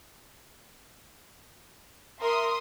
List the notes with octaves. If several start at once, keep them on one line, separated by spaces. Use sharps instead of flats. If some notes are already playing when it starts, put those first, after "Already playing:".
A#4 E5 C6 D#6